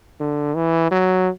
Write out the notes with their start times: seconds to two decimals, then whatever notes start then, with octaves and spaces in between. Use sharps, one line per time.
0.20 D3
0.55 E3
0.91 F#3